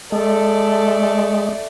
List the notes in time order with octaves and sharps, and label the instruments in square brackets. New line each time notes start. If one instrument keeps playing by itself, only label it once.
[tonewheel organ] G#3 [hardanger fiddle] A3 D5 [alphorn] A4